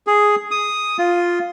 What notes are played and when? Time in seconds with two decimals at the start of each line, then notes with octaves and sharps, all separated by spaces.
0.07 G#4
0.51 D#6
0.99 F4